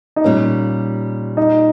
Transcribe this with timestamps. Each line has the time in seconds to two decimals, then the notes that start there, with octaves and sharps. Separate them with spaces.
0.16 D#4
0.24 A#2 G3 A#3 C#4
1.37 D#4